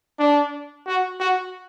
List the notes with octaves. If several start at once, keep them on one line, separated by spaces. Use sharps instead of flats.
D4
F#4
F#4